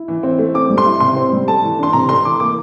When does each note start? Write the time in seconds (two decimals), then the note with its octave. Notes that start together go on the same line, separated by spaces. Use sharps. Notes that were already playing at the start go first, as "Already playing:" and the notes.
Already playing: E4
0.08 E3
0.23 C4
0.39 A3
0.54 C4 D6
0.70 G3
0.78 C6
0.86 E4
1.00 C3 C6
1.16 C4
1.32 G3
1.48 A3 A5
1.63 E3
1.79 D4 C6
1.93 C3 A#5
2.09 A3 C6
2.24 E3 D6
2.40 A#3 D6